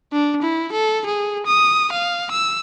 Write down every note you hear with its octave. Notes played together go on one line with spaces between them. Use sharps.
D4
E4
A4
G#4
D#6
F5
E6